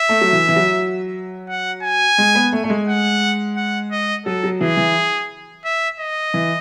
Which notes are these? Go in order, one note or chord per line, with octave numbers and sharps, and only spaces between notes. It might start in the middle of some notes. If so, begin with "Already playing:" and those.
Already playing: E5
A3
F#3
E3
E3
F#3
F#5
G#5
G#3
B3
A3
A3
G#3
F#5
F#5
D#5
F#3 A4
F#3
E3 G#4
E3
E5
D#5
E3